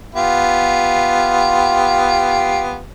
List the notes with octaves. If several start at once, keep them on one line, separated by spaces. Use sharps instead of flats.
B3 F4 G4